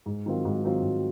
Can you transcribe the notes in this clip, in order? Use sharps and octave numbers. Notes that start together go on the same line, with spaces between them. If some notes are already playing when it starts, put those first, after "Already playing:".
G#2
D#3 F#3 C4 F4
G#2
D#3 F#3 C4 F4
G#2